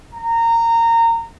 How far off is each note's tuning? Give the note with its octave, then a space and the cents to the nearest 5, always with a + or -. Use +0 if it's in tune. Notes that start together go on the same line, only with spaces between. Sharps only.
A#5 -20